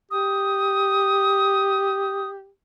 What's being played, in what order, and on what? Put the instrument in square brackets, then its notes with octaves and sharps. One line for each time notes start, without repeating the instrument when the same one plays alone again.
[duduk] G4 [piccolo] D#6